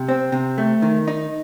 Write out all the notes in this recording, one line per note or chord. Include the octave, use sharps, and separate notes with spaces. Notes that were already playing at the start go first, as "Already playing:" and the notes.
Already playing: C3
C4
C3
A3
D#3
D#4